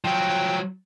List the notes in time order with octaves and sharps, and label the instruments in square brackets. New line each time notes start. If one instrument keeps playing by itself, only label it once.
[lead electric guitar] F3 F#3 [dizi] G5